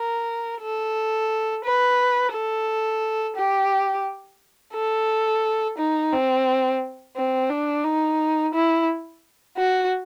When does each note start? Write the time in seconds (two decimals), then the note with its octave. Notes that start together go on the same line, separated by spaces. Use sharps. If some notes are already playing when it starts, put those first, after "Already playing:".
Already playing: A#4
0.62 A4
1.64 B4
2.34 A4
3.36 G4
4.74 A4
5.78 D#4
6.12 C4
7.16 C4
7.50 D4
7.84 D#4
8.54 E4
9.57 F#4